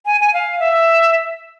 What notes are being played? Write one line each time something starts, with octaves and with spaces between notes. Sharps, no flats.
G#5
G#5
F5
E5